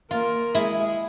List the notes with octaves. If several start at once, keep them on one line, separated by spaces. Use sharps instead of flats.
A#3 F4 A#4
G#3 E4 G#4